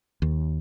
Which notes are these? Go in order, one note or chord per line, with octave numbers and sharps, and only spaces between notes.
D#2